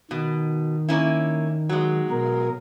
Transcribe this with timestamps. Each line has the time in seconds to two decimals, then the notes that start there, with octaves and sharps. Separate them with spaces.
0.11 B2 D#3
0.89 A#3 C#4 E4
1.69 F#3 G#3
2.10 B2 A#4